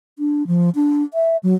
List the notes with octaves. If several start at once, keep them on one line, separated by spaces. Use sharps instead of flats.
D4
F3
D4
E5
F#3